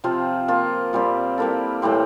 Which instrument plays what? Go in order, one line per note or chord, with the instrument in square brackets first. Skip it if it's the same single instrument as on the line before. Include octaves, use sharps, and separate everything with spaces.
[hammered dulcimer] C3 F3 C4 F4
F3 A#3 F4
A#2 G3 C4
G3 A#3 E4 A4
A2 E3 G3 C4